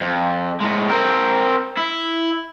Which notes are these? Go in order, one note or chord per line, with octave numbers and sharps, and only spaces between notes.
F2
A2 G#3
C4 A#4
E4